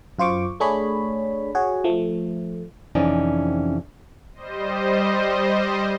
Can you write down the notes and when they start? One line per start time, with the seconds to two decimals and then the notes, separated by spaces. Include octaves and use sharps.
0.19 F#2 F4 C5 C#6 D6
0.60 A3 D4 G#4 C#5 B5
1.55 F#4 G#4 C#5
1.84 F3 A3
2.95 F2 C3 E3 C#4 D#4 D5
4.34 G3 C5 D#5